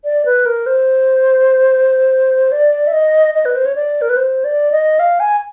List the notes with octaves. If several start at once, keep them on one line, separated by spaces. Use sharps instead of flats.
D5
B4
A#4
C5
D5
E5
D#5
D#5
B4
C5
C#5
D5
A#4
B4
C5
D5
D#5
F5
G#5